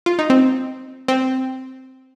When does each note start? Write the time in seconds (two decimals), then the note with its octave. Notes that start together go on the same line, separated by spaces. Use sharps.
0.06 F4
0.19 D#4
0.30 C4
1.08 C4